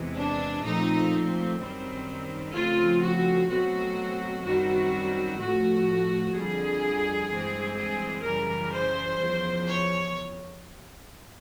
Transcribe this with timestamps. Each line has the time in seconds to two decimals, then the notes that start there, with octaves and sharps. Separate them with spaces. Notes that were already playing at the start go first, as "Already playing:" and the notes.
Already playing: E2 C3 E3 G#3
0.15 D4
0.63 A#2 F3 A3 C4 D#4
1.59 F#2 D#3 G3 C4
2.53 C#3 F3 A3 C4 F4
3.01 F#4
3.48 B2 F#3 A3 C4 F#4
4.43 F#2 D#3 G3 C4 F#4
5.39 A2 F3 A3 F#4
6.34 F2 D3 G3 G#4
7.29 G2 E3 G#3 C4
7.78 G#4
8.24 F#2 C#3 E3 G3 A#4
8.73 C5
9.19 E2 C#3 F3
9.67 C#5